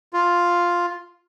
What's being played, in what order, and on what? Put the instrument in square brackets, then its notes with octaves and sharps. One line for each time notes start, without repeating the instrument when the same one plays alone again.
[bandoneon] F4